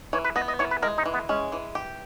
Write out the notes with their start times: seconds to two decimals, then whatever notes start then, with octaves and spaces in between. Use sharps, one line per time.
0.13 E3 C#5
0.24 B4
0.36 B3 D#5
0.48 D#5
0.59 E3 C#5
0.71 B4
0.82 G#3 A#4
0.98 D#4
1.06 E3
1.14 B3
1.29 G#3 C#4
1.52 E3
1.75 G4